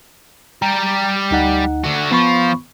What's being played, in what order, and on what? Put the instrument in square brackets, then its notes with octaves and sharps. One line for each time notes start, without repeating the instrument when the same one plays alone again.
[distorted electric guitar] G3 G4 [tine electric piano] A#5
[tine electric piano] D2 D#4 F#5
[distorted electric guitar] D3 F#4
[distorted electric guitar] F3 F4 [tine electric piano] B3 B5 C#6